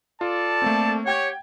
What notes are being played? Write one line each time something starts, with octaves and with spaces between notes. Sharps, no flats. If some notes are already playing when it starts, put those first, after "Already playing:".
F4 A4 D5 A5
A3 A#3 C4
G4 C#5 F#5 G5 G#6